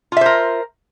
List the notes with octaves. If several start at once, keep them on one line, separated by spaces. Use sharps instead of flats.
F4 A#4 C5 E5